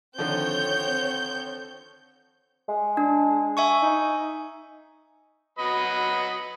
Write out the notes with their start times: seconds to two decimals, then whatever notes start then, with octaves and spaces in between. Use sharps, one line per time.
0.18 D3 D#3 F3 C4 C#5 G6
2.69 G#3
2.97 D4
3.57 E5 G#5 C#6
3.83 D#4
5.59 F#3 B4 D#5